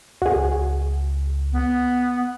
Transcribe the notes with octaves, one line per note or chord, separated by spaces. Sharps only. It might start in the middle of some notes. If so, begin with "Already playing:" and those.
C#2 F#4 G#4
B3